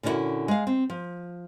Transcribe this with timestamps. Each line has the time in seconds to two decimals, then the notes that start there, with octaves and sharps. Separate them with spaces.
0.03 A#2 D3 C#4 D4 E4 F#4
0.48 G#3 F5
0.67 C4
0.90 F3